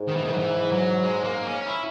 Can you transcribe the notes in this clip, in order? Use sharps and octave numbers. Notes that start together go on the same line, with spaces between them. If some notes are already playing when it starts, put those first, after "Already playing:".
Already playing: G#2
D#3
E3
D#3
F#3
E3
F#3
G#3
A#3
C#4
E4